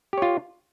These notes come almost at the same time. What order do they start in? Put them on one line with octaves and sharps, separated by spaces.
G4 C#5 F4